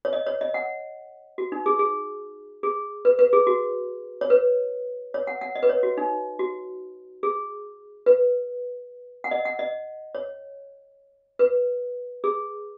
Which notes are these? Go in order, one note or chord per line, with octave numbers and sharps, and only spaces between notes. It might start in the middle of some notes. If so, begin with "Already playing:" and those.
C#5
D#5
C#5
D#5
F#5
F#4
D#4
G#4
G#4
G#4
B4
B4
G#4
F#4
C#5
B4
C#5
F#5
F#5
D#5
B4
C#5
F#4
D#4
F#4
G#4
B4
F#5
D#5
F#5
D#5
C#5
B4
G#4